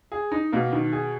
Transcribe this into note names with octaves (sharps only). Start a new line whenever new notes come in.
G#4
D#4
B2 A#3
D#3
G#4